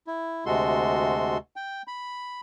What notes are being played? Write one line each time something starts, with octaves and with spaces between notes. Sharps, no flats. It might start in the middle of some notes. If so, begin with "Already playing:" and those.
E4
D2 C3 G#3 F#4 A4 C6
G5
B5